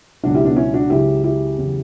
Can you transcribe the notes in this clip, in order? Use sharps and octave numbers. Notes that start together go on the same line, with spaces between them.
C#2 B2 F#3 D4 F#4
E4 G4
B3 D4
C#4 E4
D4 F#4
C#2 C#3 F#3 E4 G4
E4 G4
E2 C#3 F#3